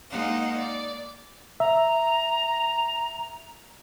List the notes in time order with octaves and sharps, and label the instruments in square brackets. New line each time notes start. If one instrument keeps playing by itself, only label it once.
[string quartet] G#3 A#3 D#4 C5 F5 F#5
D5
[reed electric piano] E5 [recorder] A#5